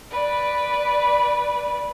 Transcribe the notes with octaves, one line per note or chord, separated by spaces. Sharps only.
B4 D5